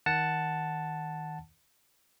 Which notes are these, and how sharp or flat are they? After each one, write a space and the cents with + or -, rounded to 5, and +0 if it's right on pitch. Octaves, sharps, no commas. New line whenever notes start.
D#3 +15 F#5 +0 A5 +0